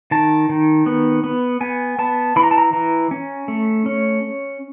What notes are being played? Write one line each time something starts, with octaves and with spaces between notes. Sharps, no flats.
D#3 A5
D#3
B3
B3
B3 G#5
B3 A5
E3 B5
A#5
A5
A#5
E3 A#5
C#4
A3
C#4